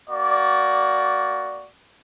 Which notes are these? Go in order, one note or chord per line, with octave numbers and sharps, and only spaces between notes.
A#3 F#4 D5